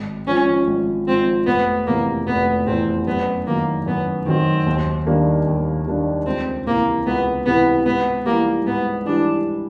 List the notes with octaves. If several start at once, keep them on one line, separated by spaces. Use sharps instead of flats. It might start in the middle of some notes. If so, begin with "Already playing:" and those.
Already playing: G#1
G#2 F3 C#4
G#1
G#2 F3 C4
F1 B3
E2 C3 A#3
F1 B3
E2 C3 C4
F#2 B3
D#3 F#3 A#3
F#2 B3
D#3 F#3 C4
D#2
D#3 G3 A#3 D4
D#2
D#3 G3 A#3 D4
C#2 C4
C3 E3 A#3
C#2 B3
C3 E3 B3
G#2 B3
E3 G3 A#3
G#2 B3
E3 G3 D4